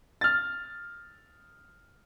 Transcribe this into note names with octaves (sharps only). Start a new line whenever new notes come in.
F6 A6